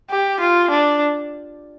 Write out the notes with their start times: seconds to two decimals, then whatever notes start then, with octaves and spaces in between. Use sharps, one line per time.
0.10 G4
0.40 F4
0.70 D4